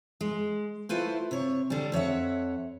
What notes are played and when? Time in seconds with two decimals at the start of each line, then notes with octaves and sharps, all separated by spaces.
0.21 G#3
0.89 A3 E4 F4 B4 C5
1.31 C3 C#5
1.70 D3 G3
1.92 F2 C#5 E5 F#5